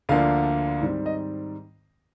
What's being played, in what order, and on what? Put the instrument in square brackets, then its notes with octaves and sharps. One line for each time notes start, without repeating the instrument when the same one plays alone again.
[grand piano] D2 D3 F3 A#3 D4 F5
G#2 D#3 G3 C4
D#5